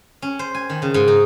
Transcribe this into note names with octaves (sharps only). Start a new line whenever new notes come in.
C#4
C5
G#5
D#3
C#3
G#2
D#4